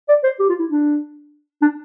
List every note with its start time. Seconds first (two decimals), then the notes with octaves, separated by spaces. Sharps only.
0.09 D5
0.24 C5
0.40 G4
0.49 F4
0.60 E4
0.70 D4
1.62 D4